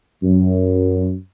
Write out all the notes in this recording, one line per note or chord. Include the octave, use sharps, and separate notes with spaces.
F#2